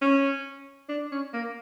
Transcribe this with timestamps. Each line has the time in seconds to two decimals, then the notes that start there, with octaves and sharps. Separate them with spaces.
0.01 C#4
0.89 D4
1.11 C#4
1.33 A#3